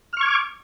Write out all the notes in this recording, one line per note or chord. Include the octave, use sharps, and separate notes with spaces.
C#6 D6 F6 G#6